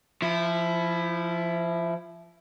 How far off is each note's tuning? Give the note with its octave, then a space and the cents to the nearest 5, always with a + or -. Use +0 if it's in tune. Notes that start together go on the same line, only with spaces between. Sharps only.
F3 -20 E4 +10